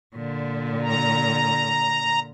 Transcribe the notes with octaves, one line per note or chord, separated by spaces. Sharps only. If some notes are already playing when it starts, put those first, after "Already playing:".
A#2 D3
A#5